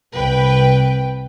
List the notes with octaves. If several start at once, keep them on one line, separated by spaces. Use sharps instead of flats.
C2 B4 G5